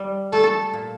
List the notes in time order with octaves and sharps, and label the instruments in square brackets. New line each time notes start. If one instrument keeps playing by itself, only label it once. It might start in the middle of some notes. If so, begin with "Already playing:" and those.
Already playing: [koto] G3
[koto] A3 [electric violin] A4
[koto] A#2